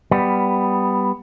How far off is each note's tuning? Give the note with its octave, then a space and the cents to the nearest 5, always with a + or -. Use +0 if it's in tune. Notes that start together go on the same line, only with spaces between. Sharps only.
G3 +0 B3 +5